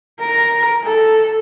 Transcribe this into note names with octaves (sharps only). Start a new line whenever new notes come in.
A#4
A4